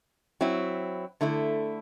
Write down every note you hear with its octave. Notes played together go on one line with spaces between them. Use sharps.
F#3 C4 E4
D3 A3 E4